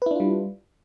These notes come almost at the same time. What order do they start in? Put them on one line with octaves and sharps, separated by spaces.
B4 E4 D4 F4 G3